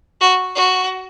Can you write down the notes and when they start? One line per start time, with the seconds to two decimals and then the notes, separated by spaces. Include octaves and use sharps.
0.21 F#4
0.55 F#4